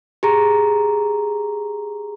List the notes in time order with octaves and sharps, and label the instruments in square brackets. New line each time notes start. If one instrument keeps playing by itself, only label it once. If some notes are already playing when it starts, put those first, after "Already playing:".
[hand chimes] G4 G#4 A#5